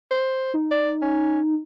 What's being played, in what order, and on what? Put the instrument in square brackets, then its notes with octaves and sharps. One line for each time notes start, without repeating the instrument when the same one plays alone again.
[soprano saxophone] C5
[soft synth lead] D#4
[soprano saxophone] D5
C#4